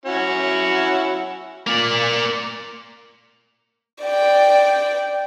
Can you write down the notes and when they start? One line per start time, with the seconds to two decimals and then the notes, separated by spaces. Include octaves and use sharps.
0.05 C#4 E4 F#4
1.67 A#3 D5
4.01 D5 G5